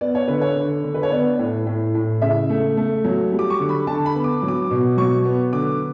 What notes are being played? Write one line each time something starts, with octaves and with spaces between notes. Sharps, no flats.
B3 D5
C#5
D3 B4
C#5
D3
D3
B4
C#5
B3 D5
A2
A2
A2
C#3 E5
A3
A3
F#3
G3
D6
C#6
D3
B5
D3 A5
B5
B3
D6
F#3
D6
B2
F#3 C#6
B3
D3 D6